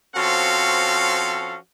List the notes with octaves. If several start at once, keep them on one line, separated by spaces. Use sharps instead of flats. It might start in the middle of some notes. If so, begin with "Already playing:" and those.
F3 C4 C#4 F#4 A4 F5